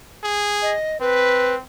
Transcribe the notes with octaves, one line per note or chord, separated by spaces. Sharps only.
G#4
D#5
C4 B4